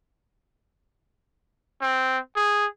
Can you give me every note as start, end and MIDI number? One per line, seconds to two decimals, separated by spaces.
1.81 2.18 60
2.36 2.66 68